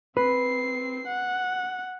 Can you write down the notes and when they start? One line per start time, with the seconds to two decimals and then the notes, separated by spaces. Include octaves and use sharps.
0.17 C4 B4 C7
1.07 F#5